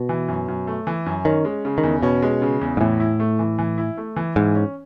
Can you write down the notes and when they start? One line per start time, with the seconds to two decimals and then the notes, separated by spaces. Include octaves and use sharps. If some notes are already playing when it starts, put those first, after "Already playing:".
Already playing: B2
0.09 E3
0.28 F#2
0.48 F#2
0.67 A3
0.87 E3
1.06 F#2
1.25 D#3 C#4
1.45 G#3
1.65 C#3
1.78 D#3
1.83 E2
2.03 B2 C#4
2.22 G#3
2.42 C#3
2.61 E2
2.77 G#2
2.81 A2 E3
3.00 E4
3.20 A3
3.39 E3
3.59 E3
3.78 E4
3.97 A3
4.16 E3
4.36 G#2 E3
4.55 C#4